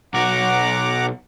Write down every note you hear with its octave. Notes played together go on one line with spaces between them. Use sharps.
B1 F#4 F#5 A#5 D6